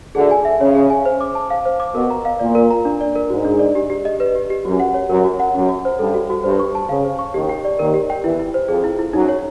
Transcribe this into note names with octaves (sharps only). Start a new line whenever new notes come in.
D2 D3 G#4
G#5
E5
C#3 C#5
G#4
G#5
C5
D6
A5
F5
C5
D6
B2 A#4
A#5
F5
A#2 D5
A#4
A#5
D4
D5
A#4
G#2 F#4
D4
D5
G4
G4
D#5
B4
G4
G4
F#2 F#4
F#5
C#5
F#2 A#4
F#4
F#5
F#2 F#4
F#4
C5
G2 A4
F#4
F#4
G2 C5
C#6
A5
C#3 F5
C5
C#6
D#2 D#3 G4
G5
D5
D#2 D#3 A#4
G4
G5
E2 E3 E4
E4
C5
F2 F3 G#4
E4
E4
F#2 F#3 D#4
C#5